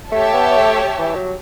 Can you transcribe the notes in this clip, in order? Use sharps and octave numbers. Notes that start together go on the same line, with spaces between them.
A3 G4 C#5 E5 A5
B3
A3
E3
F#3